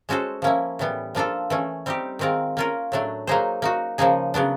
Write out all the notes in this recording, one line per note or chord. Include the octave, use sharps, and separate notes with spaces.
G#3 C#4 F#4 A4 C5
F3 A#3 C#4 E4
A2 E3 G3 B3
F3 A#3 D4 F4 A4
E3 A3 C#4
G3 C4 D#4 G4
D#3 G#3 C4 F4 A#4
A#3 C#4 F4 A#4
A2 F#3 A3 D4
F#3 A#3 D#4 G#4 C5
A#3 D#4 F#4
C#3 F3 A#3 D#4 G#4
C#3 F#3 B3 D4